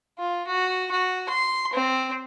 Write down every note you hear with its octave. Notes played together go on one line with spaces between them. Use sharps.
F4
F#4
F#4
C6
C4